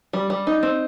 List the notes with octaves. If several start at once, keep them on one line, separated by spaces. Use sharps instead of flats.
G3
G3
D#4
C4